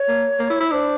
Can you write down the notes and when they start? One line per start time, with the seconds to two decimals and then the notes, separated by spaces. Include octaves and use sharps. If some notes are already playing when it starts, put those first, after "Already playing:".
Already playing: C#5
0.08 A#3
0.40 A#3
0.50 E4
0.60 E4
0.71 D4 C5